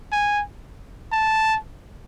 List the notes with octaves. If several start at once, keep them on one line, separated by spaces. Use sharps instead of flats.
G#5
A5